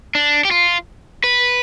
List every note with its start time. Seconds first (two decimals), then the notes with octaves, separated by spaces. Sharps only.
0.15 D4
0.45 G4
0.51 F4
1.24 B4